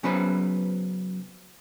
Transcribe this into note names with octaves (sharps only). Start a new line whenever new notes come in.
C#3 F#3 B3 B4 C5 B5